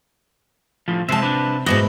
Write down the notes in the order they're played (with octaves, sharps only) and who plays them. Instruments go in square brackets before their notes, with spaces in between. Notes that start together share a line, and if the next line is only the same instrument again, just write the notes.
[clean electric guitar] A2 F3
[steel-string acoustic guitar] C3 A5 [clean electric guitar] G#3 C5 E5
[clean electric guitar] D4 B4
[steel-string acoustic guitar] G#2 B2 E4 [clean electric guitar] F#4 D5 D#5